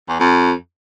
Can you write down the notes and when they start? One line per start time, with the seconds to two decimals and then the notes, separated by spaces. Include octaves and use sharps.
0.09 E2
0.20 F2